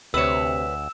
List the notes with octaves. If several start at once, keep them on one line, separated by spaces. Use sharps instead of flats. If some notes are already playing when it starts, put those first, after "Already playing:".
D2 C3 B4 C#5 E6 E7